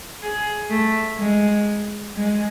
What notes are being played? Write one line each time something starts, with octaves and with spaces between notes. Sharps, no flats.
G#4
A3
G#3
G#3